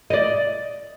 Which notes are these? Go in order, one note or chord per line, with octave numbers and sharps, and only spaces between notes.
D5 D#5